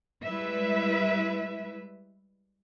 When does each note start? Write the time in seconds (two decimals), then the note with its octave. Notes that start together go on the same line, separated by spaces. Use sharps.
0.24 G3 G#3 E4 B4 E5